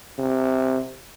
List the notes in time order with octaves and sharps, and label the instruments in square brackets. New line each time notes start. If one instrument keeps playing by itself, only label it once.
[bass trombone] C3